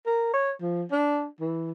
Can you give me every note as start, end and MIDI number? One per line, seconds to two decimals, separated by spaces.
0.06 0.33 70
0.34 0.51 73
0.61 0.84 53
0.92 1.25 62
1.40 1.72 52